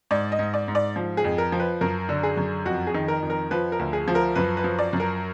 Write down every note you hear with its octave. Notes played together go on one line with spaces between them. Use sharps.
G#2 D5
D#5
G#2
D5
G#2
D5
F3
G#4
F2
A#4
F3
B4
F#2 A#4
D3
G#4
F#2
F2 F#4
G#4
D#3
A#4
F2
A#4
F3 B4
A#4
D2
G#4
F3
A#4
F#2 B4
B4
F3
D5
F#2
A#4